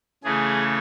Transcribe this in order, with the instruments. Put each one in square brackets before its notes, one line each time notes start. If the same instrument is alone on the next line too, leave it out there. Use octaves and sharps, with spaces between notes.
[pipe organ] C#3 E3 A3 G#4